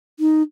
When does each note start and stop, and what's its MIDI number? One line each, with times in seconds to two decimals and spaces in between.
0.19 0.42 63